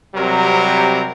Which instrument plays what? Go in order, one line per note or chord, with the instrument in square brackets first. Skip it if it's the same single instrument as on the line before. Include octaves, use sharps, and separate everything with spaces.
[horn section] C3 F#3 G3 C4 A#4